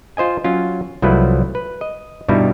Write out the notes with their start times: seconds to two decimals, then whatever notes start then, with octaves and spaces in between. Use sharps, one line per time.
0.17 F4 C5 D#5 G#5
0.44 F#3 C#4 F4
1.02 C2 F3 F#3 A3 E4 B4
1.55 B4
1.81 D#5
2.28 G2 B2 G3 D#4 E4